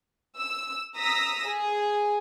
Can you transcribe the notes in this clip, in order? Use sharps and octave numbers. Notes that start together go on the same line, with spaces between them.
E6
A#5 D#6 E6 A#6 B6
G#4